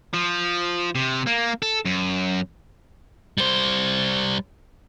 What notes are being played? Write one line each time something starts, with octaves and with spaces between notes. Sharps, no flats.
F3
C3
A#3
A4
F#2
G3 C5